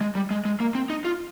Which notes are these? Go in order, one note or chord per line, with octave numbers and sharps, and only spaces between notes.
G#3
G3
G#3
G#3
A#3
C4
D#4
F4